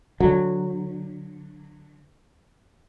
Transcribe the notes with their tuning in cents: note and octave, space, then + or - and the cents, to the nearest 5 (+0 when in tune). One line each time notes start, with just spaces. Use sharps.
D3 +0 F#3 -15